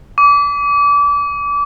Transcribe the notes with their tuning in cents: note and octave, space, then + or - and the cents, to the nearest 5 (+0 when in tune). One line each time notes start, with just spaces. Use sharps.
D6 -30